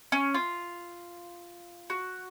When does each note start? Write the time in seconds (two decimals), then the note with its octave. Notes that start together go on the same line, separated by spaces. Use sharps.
0.12 C#4
0.34 F4
1.90 F#4